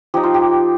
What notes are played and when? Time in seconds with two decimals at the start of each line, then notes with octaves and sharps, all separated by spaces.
0.14 F3 D#4 G4
0.23 F4
0.34 G4